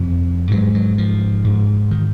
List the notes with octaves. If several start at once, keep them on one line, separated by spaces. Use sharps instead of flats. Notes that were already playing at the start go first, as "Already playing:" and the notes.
Already playing: F2 C3
G#2 F#3
F#3
F3
G#2
D#3